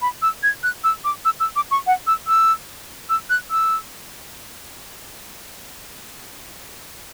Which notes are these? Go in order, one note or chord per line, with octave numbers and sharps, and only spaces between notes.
B5
E6
G#6
F#6
E6
D6
E6
E6
D6
C#6
F#5
E6
E6
E6
F#6
E6